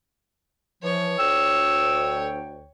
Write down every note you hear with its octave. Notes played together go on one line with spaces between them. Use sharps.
E3 F3 C#5
D2 G5 E6